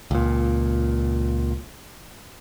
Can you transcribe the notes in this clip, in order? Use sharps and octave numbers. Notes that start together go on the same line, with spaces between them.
C#2 A#2